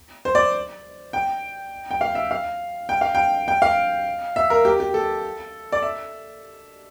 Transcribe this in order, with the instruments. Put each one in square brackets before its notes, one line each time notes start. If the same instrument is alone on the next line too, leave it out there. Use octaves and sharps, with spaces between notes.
[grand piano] C5
D5
G5
G5
F5
E5
F5
G5
F5
G5
G5
F5
E5
A#4
G4
G4
A4
D5
E5